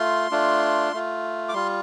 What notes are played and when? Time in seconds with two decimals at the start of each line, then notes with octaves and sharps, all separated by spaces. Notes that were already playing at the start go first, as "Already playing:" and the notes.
Already playing: A3 F4 C6
0.31 A3 D4 F4
0.93 A3 F4
1.49 D6
1.53 G3 F4 C6